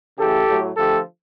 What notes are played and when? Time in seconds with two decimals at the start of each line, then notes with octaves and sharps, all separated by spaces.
0.18 C#3 E3 A3 G4 A4
0.47 A2 F#3 A3
0.77 D3 F3 A3 G4 A4